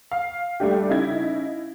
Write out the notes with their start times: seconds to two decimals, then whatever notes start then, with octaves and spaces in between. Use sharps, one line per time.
0.11 F5
0.60 G3 A3 D4 G4
0.89 C#3 D#4 E4 G#6